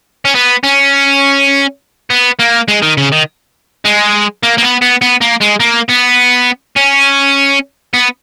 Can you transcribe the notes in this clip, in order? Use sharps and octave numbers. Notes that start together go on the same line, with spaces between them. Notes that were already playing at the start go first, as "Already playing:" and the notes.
C#4
B3
C#4
B3
A#3
G#3
D#3
C#3
D#3
G#3
A#3
A#3
B3
B3
B3
A#3
G#3
A#3
B3
C#4
B3